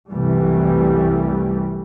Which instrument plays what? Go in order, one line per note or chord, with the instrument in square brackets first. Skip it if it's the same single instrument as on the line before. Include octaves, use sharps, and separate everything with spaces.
[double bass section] C2 F#2 E3 G3 A3